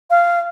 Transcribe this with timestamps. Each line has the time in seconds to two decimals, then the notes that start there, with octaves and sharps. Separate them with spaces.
0.10 F5